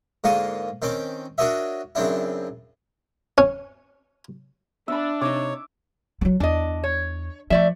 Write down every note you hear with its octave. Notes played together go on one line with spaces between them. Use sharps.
G#2 D3 A#3 F4 C#6 D#6
D#3 C4 C#4 D6
D4 F#4 A#4 C#5 D#5 E5
F#2 C#3 C4 D4 E4
C#4
B3 D4 E5 B5
C3 D#4 C#5 D6
F#3 A3
E2 D4 D#5
C#5
F3 A3 D5 E5